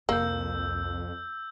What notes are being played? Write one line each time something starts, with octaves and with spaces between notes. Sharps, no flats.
C2 F2 A#3 E6 G6